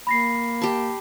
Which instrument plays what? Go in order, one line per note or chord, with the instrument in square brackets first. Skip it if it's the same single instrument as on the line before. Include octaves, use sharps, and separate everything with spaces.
[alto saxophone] A#3 [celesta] B5 A#6 C7
[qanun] G4 A5